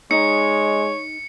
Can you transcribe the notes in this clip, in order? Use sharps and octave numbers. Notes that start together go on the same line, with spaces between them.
G#3 D#4 C#5 C#7